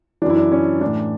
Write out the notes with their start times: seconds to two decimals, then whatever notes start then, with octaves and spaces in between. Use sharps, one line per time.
0.22 E3 D4
0.25 F#2 E4
0.36 D4
0.52 C#4
0.81 E3 D4
0.86 A2